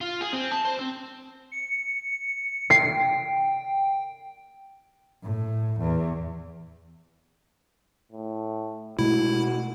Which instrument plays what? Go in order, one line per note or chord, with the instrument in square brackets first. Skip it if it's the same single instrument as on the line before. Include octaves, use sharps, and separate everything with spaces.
[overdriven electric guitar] F4
G#4
C4
A5
C5
C4
[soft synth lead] C#7
[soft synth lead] G5 [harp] C7
[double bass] A2
E2
[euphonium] A2
[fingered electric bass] B2 G#3 A3 [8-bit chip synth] E4 [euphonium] F#4